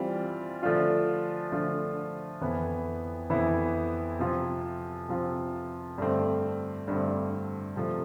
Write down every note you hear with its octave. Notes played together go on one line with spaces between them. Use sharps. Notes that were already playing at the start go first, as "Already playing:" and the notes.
Already playing: E3 G3 C4 F4
D3 F3 A3 D4 F4
D3 F3 A3 D4 F4
F2 E3 B3 E4
F2 E3 B3 E4
C3 F3 C4 F4
C3 F3 C4 F4
G2 D3 A3 C4
G2 D3 A3 C4
C3 F3 A3